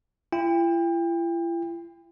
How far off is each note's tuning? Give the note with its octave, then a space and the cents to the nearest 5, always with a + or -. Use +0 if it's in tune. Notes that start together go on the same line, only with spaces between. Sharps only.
E4 +45 G5 +30